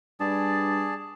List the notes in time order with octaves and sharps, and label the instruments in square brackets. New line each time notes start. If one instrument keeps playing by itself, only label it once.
[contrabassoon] G2 [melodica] G#4 D5 A5